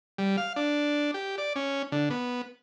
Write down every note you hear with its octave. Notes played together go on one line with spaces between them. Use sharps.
G3
F5
D4
G4
D5
C#4
D3
B3